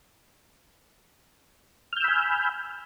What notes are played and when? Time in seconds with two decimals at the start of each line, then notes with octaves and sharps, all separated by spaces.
1.93 F6
1.97 G6
2.00 E6
2.04 B5
2.08 G#5